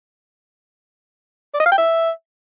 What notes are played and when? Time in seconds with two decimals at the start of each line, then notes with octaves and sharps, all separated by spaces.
1.54 D5
1.60 D#5
1.66 F5
1.72 G5
1.78 E5